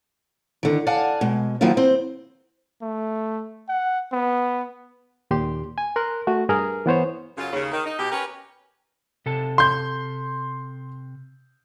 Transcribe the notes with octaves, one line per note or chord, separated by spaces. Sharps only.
D3 D#3
D5 F5 F#5 G#5 A5
B2 G#3
D#3 F3 F#3 A#3 E4 F4
C4 C5
A3
F#5
B3
D#2 A#2 G4 C6
G#5
A#4 C6 F#6
A3 F#4
G2 G#4 A#4 F6
E3 B3 C5 C#5
F#2 C#3 F#3 F4
D#2 C#3
D#3
D#4
B2 G4
C#4 G4 A#4 B4 C#5
C3 A4 A5
C6 G6